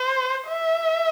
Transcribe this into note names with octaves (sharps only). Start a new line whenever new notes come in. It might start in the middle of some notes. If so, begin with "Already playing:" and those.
Already playing: C5
E5